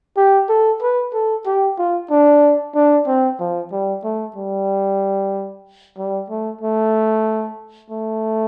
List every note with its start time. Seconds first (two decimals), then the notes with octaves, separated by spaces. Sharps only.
0.17 G4
0.49 A4
0.82 B4
1.13 A4
1.46 G4
1.78 F4
2.10 D4
2.75 D4
3.07 C4
3.39 F3
3.72 G3
4.03 A3
4.36 G3
5.97 G3
6.29 A3
6.61 A3
7.90 A3